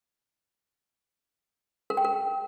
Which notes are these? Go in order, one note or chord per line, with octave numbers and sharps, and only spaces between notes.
A#4
G5
A#4